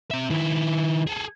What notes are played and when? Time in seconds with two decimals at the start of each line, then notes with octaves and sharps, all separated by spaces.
0.11 C4 E5
0.30 D#3 E4
1.07 G#4 A4